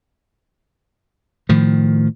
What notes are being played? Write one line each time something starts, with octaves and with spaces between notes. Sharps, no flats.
A2 D#3 F3